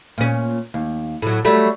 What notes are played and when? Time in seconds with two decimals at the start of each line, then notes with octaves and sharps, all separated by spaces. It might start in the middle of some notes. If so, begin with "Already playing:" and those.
0.18 A#2 C#4
0.74 D#2
1.22 A2 F#3
1.45 F#3 G3 A3